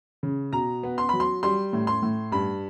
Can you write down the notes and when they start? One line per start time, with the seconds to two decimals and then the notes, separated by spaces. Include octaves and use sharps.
0.23 C#3
0.53 B2 A#5
0.83 B3
0.98 C6
1.09 F#3 B5
1.20 C6
1.43 G3 C6
1.73 A2
1.87 C6
2.03 A2
2.32 G2 B5